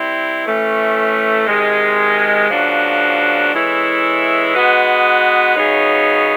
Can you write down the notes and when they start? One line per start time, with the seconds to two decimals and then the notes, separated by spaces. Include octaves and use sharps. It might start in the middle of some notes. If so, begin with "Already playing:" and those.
Already playing: G3 C4 E4
0.44 A2 E3 A3 C#4
1.47 C3 D#3 G#3
2.49 C#3 F3 A#3 D4 F#4
3.52 E3 G#3 C#4 E4 A4
4.55 G#3 B3 D#4 F#4 B4
5.57 C#3 F#3 B3 D#4 G#4